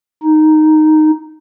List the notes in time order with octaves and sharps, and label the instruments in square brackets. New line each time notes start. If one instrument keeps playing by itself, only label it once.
[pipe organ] D#4